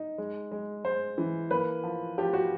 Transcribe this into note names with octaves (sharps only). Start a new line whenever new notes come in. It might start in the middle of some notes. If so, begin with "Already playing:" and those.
Already playing: D#4
G#3
G#3
G#3 C5
E3
A#3 B4
F3
F3 G4
F#4